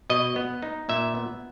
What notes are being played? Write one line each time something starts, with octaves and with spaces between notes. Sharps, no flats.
B2 D#5
B3
D#4
A#2 E5
B3